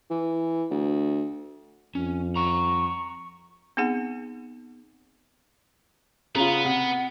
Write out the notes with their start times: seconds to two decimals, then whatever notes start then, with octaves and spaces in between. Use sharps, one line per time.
0.11 E3
0.71 D2
1.95 F2 C#4
2.36 F#5 A#5 C#6
3.77 B3 C4 D#4 G#4 F#5
6.35 C#3 B3 F4 A#5
6.65 C3 F#5